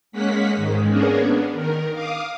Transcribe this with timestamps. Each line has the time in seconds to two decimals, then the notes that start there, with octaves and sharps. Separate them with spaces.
0.12 G#3 A#3 C#4 F#5 B6
0.56 G#2 D#3 G#3
0.89 A#3 B3 C#4 D4 G#4 A#4
1.20 B3 D4
1.53 D#3 A#4
1.93 F5 D6 D#6